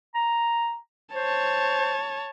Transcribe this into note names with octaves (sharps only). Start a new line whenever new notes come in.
A#5
C5 C#5 A5